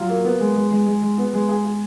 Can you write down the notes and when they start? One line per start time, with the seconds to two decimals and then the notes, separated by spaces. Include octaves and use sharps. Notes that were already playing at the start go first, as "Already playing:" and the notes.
Already playing: F#3 F4
0.09 A#3
0.25 B3
0.40 G#3
0.55 G#3
0.71 G#3
0.87 G#3
1.02 G#3
1.18 B3
1.34 G#3
1.49 G#4
1.65 G#4